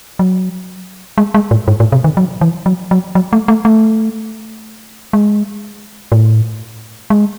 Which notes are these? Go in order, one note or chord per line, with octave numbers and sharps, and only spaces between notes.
F#3
G#3
G#3
A2
G#2
A2
C3
D#3
F#3
E3
F#3
F#3
F#3
A3
A3
A3
G#3
A2
G#3